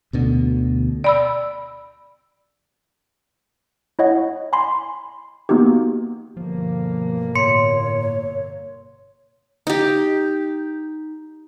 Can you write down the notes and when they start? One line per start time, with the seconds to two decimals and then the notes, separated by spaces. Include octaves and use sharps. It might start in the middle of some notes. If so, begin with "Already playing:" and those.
0.13 D2 B2 D3
1.04 D5 B5 E6
3.99 E4 C#5 D#5 F#5
4.53 G#5 B5 C6
5.49 A#3 B3 D#4 F#4 G4
6.37 G1 B2 F3 A#3
7.35 A2 C#5 C6 C#7
9.67 D#4 G4